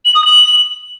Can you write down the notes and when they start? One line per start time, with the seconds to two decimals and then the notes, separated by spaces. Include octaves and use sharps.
0.05 F#7
0.15 D#6
0.24 F#7